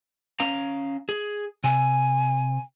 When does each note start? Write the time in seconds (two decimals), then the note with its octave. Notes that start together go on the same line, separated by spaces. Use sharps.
0.40 C#4 F5 A#5
1.09 G#4
1.64 C3 G#5